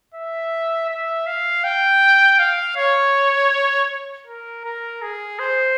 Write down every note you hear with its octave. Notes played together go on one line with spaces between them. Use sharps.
E5
E5
F5
G5
F5
C#5
A#4
A#4
G#4
C5